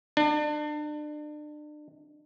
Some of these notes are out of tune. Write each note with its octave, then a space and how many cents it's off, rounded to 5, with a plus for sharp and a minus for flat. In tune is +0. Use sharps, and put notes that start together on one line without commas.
D4 +35